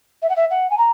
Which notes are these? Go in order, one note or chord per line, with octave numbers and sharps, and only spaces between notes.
E5
F#5
E5
F#5
G#5
A#5